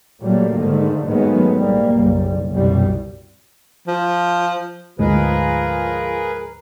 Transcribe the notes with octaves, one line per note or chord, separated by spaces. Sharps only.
A#2 F#3 G3 A3 A#3
G#2 D3 D#3 A3
G#2 D#3 F#3 G#3 A3 B3
A#1 G#2 G3 A#3
F#1 B1 G3
G1 C2 F#2 B2 G3
F3
D2 G#2 F3 G#3 G#4 A#4 B4